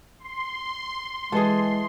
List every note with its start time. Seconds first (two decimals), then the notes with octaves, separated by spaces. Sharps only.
0.20 C6
1.32 E3 G#3 G#4 A4